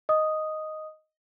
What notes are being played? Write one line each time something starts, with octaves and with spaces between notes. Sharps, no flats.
D#5 D#6